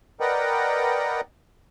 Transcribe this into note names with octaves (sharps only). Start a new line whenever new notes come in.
A#4 B4 D5 D#5 F#5 G5